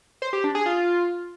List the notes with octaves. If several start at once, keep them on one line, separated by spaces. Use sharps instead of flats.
C5
G4
D4
G#4
F4